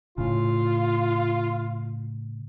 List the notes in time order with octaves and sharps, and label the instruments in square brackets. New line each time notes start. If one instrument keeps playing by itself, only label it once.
[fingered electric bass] A2 C#3 [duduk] F4